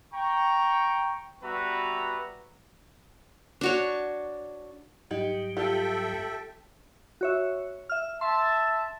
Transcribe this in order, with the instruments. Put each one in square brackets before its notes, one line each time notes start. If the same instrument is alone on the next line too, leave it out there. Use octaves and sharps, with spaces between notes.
[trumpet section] G5 A#5 C#6
G3 B3 F#4 B4 E5 A#5
[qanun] D4 F#4 C#5
[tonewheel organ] G#2 F#3 G3 [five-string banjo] D#4 G4
[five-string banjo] F4 G4 [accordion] A4 E5 G5
[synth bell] F#4 C#5 E5
E5 F6
[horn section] E5 A5 [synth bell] C6